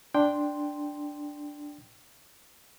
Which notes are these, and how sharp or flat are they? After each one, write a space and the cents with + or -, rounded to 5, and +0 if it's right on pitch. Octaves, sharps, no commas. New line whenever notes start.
D4 +0 G5 +0 C6 +0